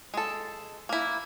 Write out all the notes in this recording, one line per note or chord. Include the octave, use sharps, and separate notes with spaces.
G#3 A4
A#3 E4